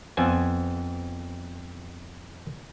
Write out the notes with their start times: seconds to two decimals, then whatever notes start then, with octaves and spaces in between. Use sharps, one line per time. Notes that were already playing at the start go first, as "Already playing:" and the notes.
0.17 F2 B3 C5 G#5